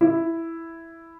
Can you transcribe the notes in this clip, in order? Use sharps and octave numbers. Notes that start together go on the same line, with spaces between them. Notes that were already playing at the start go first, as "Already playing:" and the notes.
E4